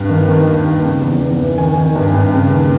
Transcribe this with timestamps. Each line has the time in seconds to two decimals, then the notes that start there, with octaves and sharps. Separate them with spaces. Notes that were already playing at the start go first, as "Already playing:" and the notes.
Already playing: G2
0.09 D#3
0.28 D#3
0.47 D#2
0.65 D#2
0.84 C#3
1.02 E2
1.21 E2
1.39 E3
1.58 D#3 G#5
1.77 D#3
1.96 G2
2.14 G2
2.33 C#3
2.51 D#2